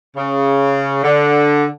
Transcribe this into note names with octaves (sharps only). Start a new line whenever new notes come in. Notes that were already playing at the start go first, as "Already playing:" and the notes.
C#3
D3